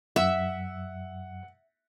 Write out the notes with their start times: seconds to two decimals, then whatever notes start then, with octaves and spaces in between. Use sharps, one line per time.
0.16 F#2 E5 F#5